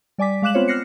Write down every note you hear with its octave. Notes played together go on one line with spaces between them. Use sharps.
G3 D5 G#5 D6 B6
G#3 F5 D6 F#6 E7 F#7
B3 C4 F4 C5 C#5
F6 F#6 A#6 C7 C#7